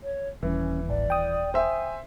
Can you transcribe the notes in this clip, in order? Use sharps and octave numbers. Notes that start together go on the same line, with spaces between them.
C#5
D#1 E3 C#4
A1 D5
G5 D#6
C5 E5 G#5